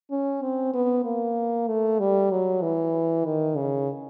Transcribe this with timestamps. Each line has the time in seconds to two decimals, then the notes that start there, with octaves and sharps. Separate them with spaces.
0.11 C#4
0.42 C4
0.74 B3
1.05 A#3
1.68 A3
1.99 G3
2.31 F#3
2.62 E3
3.25 D#3
3.56 C#3